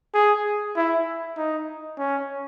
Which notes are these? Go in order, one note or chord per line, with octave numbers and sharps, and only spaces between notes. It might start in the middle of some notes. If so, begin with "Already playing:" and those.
G#4
E4
D#4
C#4